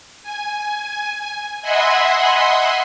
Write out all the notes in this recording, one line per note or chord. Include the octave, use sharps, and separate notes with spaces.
G#5
D#5 E5 F#5 G#5 B5 C6